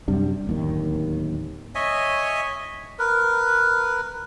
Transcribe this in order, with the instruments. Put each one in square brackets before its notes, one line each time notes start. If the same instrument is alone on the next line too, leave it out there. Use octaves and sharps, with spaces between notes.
[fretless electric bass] F#2 C3 G3 D4
D1 D#2 D#3
[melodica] C#5 D#5 E5 G#5
A#4 B4